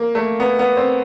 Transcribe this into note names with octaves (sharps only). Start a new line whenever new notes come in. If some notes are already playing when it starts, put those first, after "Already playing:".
Already playing: A#3
A3
B3
B3
C4